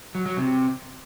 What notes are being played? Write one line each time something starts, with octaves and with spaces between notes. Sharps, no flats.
F#3
F#3
C3